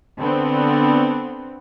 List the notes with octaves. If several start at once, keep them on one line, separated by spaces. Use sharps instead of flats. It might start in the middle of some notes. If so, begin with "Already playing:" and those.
D3 B3 C4